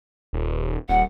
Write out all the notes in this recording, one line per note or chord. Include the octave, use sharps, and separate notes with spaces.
D#1
D#1 F#5